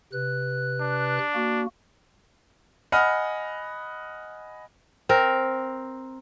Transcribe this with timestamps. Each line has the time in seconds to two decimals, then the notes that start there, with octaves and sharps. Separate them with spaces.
0.13 C3 B4 F#6
0.81 D4
1.35 A#3 F#4
2.92 D#5 F#5 G#5 B5 D#6 F6
5.09 C4 A#4